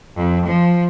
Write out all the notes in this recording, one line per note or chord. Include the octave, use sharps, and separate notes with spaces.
F2
F3